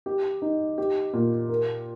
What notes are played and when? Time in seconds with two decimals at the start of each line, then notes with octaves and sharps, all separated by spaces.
0.06 G4
0.42 D#4
0.78 G4
1.13 A#2
1.49 A#4